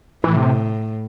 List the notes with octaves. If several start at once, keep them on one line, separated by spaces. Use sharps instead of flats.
A2 E3
C3